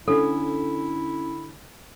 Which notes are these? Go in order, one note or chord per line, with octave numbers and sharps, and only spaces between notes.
D3 C#4 E4 A4